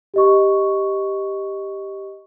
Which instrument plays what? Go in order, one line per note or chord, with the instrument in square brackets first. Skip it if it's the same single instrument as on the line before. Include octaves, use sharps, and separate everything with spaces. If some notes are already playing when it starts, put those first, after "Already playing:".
[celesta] G4 D#5 C#6